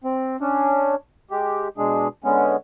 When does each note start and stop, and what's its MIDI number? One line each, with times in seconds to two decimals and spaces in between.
0.04 0.37 60
0.41 0.95 61
0.41 0.95 62
1.31 1.68 56
1.31 1.68 67
1.78 2.08 47
1.78 2.08 56
1.78 2.08 62
1.78 2.08 68
2.24 2.56 50
2.24 2.56 56
2.24 2.56 59
2.24 2.56 61